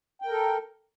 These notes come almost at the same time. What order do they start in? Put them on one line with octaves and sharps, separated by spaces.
G5 A#4 A4